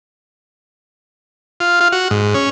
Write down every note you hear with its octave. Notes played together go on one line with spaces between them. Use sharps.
F4
F4
F#4
G#2
C#4